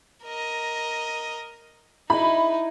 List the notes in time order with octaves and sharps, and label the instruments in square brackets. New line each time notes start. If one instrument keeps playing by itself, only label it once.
[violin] A#4 D#5
[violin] D#4 [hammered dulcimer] E4 D#5 [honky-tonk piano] B5